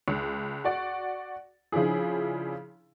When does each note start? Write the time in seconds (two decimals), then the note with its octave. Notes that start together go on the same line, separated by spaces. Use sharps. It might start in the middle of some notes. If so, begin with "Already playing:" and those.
0.08 C#2
0.64 F#4 D5 F#5
1.72 C#3 F3 D4 E4 G#4